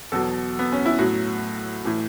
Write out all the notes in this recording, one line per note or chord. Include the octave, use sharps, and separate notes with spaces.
E2 B2 F#3 A4
B3
C#4
E4
A2 F#3 F#4
A2 E3